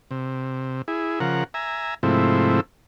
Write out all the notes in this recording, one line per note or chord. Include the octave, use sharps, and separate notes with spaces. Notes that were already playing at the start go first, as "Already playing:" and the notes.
C3
E4 G#4
C#3 F3 A#4 F#5
E5 G#5 A#5
G#2 C3 F3 A3 C4 E4